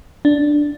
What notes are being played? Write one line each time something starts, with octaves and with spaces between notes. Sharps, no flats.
D4